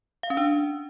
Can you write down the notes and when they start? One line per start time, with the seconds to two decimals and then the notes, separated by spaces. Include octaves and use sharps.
0.23 F5
0.30 C#4
0.37 D4